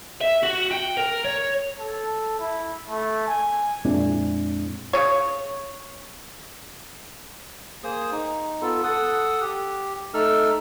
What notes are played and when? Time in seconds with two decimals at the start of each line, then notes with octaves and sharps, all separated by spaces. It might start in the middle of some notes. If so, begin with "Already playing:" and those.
0.21 E5
0.43 F#4
0.71 G5
0.98 A#4
1.25 C#5
1.80 A4
2.40 E4
2.90 A3
3.28 G#5
3.85 F2 A#2 G#3 C4 D4 E4
4.93 C#3 C#5
7.84 A#3 G#4 C5 D#6
8.12 D#4
8.62 B3 F4 A4
8.83 A4 F#5 D#6
9.41 G4
10.14 A3 D#4 A4 E6 F6